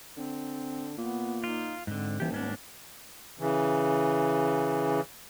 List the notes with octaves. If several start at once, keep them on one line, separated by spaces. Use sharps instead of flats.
D3 C4
A#2 B3
D#4 F4
G#2 D3 C4
D#1 E3 G4
G#2 B3 C#4 D4
C#3 E3